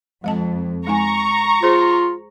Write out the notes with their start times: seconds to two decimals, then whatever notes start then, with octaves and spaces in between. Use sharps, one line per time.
0.24 F2 G#3 D#5 A5
0.87 G#3 D#4 G#5 A#5 C#6
1.63 F4 G#4 C5